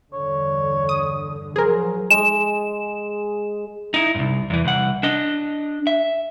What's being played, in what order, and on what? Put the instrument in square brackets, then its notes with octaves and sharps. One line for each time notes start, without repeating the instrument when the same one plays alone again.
[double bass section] E2 G2 D3 [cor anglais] C#5
[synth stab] D#6
[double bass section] F3 F#3 [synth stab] G#4 A#4 [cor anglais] C5
[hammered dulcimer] G#3 [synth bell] E7
[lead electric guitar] D#4 E4
C2 G2
E2 E3
C2 F#5
D4 D#5
E5